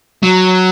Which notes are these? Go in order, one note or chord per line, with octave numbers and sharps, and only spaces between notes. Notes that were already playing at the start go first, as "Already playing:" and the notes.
F#3